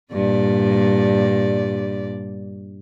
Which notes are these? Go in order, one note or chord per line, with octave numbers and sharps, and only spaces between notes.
G2 A#2 D5